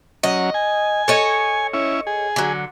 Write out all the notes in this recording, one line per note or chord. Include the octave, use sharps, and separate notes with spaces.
F#3 C#4 D#5
G#5
A4 C#5 D#5
C#4 E4
G#4
D3 F#3